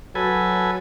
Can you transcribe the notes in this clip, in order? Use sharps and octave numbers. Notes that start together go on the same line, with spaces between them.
F#3 A4 B4 G#5